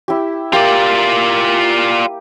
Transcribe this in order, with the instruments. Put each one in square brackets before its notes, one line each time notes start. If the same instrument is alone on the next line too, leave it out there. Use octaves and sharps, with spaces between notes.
[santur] E4 G4
[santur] A#3 G4 [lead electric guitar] F4 D5